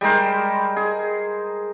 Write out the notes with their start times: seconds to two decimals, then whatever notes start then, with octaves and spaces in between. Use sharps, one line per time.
0.01 G3 G#3 A#4 C5
0.76 G#4